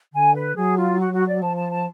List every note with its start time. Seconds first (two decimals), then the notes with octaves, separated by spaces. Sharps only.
0.13 D3 G#5
0.34 B4
0.56 F#3 G#4
0.77 F4
0.99 F#4
1.13 F#4
1.27 D5
1.42 F3 A5
1.57 A5
1.71 A5